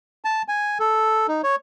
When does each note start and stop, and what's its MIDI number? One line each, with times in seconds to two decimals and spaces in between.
0.25 0.42 81
0.48 0.78 80
0.79 1.27 69
1.28 1.42 63
1.44 1.56 73